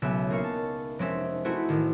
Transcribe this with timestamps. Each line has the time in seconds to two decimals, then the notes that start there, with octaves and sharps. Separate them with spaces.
0.02 B1 C#3 G#3 B3 E5 E6
0.29 C#2 A#3 D#4 F5 C#6 C#7
0.44 A5
0.99 F1 G#3 C4 C#4 D#4 E5
1.44 A3 C4 E4 F#4 G#4 B4
1.69 A1 D#3